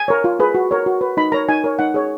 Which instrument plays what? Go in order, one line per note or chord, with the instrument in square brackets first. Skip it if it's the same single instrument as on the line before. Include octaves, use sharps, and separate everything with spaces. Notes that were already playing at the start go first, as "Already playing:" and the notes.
Already playing: [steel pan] G#5
A#4 C#5
F4
G#4 B4
F#4
A#4 C#5
F#4
B4
D#4 B5
A#4 C#5 A#5
D#4 G#5
A#4 C#5
D#4 F#5
G#4 C#5